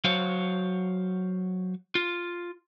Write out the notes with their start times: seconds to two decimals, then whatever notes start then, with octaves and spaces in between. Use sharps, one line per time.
0.04 F#3 F#4 C5 C#5 F5
1.95 F4